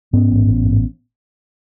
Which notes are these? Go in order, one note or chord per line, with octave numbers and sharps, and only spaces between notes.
G#2 B3 C#4
A1
A1
G#2